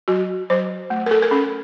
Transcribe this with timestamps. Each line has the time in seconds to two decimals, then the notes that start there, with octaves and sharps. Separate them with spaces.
0.08 F#3 F#4
0.50 F#3 C5
0.90 A3
1.06 A#4
1.11 A4
1.23 A#4
1.31 C#4 A4